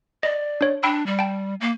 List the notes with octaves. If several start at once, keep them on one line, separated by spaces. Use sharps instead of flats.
D5 D#5
D4 C#5
D4 G5 B5 E6
G3
G5 A5
A#3